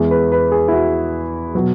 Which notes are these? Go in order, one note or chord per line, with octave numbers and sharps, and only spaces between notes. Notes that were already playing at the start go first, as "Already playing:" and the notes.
Already playing: E2 E3 G#3 G#4
B4
B4
G#4
E4
F#4
B2 F#3